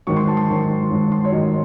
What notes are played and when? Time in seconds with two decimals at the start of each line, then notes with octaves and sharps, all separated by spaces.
0.07 G#2 D#3 F#3 C#6
0.16 C6
0.28 A5
0.37 C6
0.49 G#2 D#3 F#3
0.91 G#2 D#3 F#3
1.12 C6
1.25 C#5
1.33 G#2 D#3 F#3 D#5